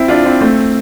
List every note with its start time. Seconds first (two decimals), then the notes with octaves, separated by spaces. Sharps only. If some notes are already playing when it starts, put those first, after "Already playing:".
Already playing: C4 E4
0.08 D4 F4
0.24 C4 E4
0.41 A3 C4